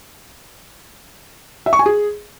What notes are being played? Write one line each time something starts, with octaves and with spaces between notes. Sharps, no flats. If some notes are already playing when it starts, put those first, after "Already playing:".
E5
C#6
G#5
G#4